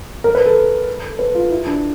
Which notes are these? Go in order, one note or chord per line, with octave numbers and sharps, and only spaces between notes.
A#4
B4
A4
B4
F4
E4
D4